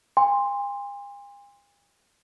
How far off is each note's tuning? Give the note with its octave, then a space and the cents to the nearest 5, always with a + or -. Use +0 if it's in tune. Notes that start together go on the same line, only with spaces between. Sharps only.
G#5 -45 C6 +0